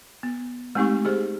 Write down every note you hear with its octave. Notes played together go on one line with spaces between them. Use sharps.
B3
G#3 A3 C4 D#4 G4 C#6
G4 G#4 C5